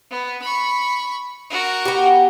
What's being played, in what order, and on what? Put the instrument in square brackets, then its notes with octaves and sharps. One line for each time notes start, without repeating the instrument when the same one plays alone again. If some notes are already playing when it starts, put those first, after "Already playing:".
[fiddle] B3
B5 C#6
F#4 A#4
[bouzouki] B3 G4